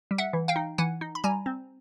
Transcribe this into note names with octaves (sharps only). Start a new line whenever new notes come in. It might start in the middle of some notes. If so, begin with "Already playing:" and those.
G3
E5 F#5
E3
F5 G5
D#4
E3 F#5 G#5
D#4
B5
G3 G#5 A#5
C4